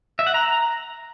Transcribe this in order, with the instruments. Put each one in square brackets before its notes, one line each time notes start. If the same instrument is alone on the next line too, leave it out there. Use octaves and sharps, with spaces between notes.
[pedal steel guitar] E5
F#5
A#5